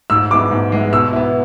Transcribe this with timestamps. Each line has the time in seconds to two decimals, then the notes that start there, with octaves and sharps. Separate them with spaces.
0.10 G#2 E6
0.31 G#3 B3 E4 D6
0.51 G#2
0.72 G#3 B3 E4
0.93 B2 E6
1.13 B3 E4